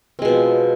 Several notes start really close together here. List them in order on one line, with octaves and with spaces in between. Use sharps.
C4 G#3 B2 F3